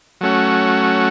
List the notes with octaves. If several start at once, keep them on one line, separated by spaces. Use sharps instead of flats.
F#3 A3 C#4 F#4